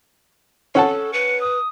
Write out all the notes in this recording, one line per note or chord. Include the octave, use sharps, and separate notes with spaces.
C#4 A4 F#5 A5
B4 C#7
D#6